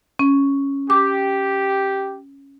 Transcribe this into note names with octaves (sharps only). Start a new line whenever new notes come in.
C#4
G4 D6